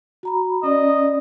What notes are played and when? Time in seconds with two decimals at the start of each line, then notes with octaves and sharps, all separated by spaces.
0.23 F#4 A#5 B5
0.63 C#4 D5 D#5